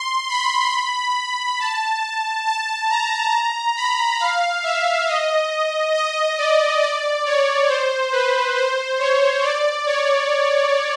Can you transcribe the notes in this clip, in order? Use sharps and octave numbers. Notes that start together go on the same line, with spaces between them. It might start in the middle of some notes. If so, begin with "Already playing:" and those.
Already playing: C6
B5
A5
A5
A#5
B5
F5
E5
D#5
D#5
D5
D5
C#5
C5
B4
C5
C#5
D5
C#5